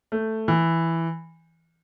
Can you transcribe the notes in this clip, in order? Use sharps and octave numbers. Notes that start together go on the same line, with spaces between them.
A3
E3